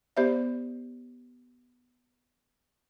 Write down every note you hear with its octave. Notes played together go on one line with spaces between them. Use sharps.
B3 G4 C5 D5 E5